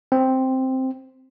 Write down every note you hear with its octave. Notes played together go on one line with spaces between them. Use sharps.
C4